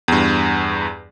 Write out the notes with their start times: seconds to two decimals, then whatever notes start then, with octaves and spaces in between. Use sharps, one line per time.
0.08 E2 G2